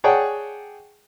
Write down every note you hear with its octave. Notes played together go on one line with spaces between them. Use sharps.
G#4 C#5 D5 F#5 G5 A5